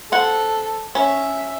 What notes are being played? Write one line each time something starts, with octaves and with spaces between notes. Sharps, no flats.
C4 A4 F#5
C#4 E5